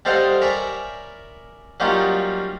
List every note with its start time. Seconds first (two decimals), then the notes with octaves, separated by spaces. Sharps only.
0.05 G3 A4 C5 D#5 F5 F#5
0.41 A#4 C#5 D5 E5 G#5 B5
1.80 F#3 G3 A#3 C#4 D#4 F4